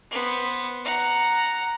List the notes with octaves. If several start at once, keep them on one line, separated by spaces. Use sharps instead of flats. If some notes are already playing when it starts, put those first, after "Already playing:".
B3 C5
F#5 A#5